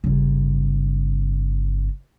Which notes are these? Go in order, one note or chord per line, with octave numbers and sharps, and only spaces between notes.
G1 C#3